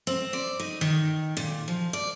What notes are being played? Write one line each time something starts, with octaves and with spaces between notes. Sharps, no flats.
C4
D5
D#4
D#3
A#2
F3
D5